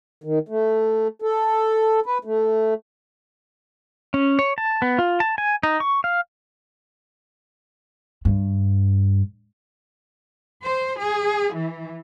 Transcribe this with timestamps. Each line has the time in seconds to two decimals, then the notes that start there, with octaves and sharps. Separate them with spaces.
0.24 D#3
0.49 A3
1.22 A4
2.06 B4
2.25 A3
4.14 C#4
4.39 C#5
4.58 A5
4.82 B3
4.99 F4
5.20 A5
5.38 G#5
5.63 D#4
5.80 C#6
6.04 F5
8.25 G2
10.63 C5
11.00 G#4
11.55 E3